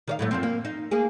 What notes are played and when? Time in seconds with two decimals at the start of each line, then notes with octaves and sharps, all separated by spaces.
0.07 D#3 D5 F5
0.19 A2 F#3 A3
0.31 F#2 F3 C4
0.43 A#3
0.65 D#4
0.91 A#3 G#4